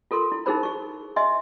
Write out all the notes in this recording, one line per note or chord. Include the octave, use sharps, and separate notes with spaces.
F4 A4 A#4 C6
E4
D#4 E4 G#4 A#4 C5 B5
G#4 C#6
D#5 E5 G#5 C6